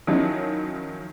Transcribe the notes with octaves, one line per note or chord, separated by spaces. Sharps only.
D#3 F3 F#3 C#4 D#4 E4